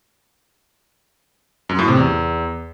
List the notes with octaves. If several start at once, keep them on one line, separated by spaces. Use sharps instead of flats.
F#2
A2
C3
E2